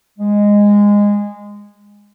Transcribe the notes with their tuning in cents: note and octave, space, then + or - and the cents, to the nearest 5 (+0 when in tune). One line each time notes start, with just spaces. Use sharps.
G#3 -15